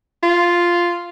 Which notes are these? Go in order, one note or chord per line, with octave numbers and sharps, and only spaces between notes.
F4